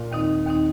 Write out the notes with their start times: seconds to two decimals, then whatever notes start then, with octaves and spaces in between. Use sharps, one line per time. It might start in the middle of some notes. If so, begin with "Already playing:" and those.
Already playing: A#2
0.12 D#2 D#3 C4 D#4
0.46 D#2 D#3 C4 D#4